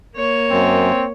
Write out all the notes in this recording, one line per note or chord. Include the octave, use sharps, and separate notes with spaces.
A#3 C#5
F#2 C4